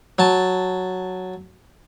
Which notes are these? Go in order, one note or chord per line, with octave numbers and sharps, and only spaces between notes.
F#3 A5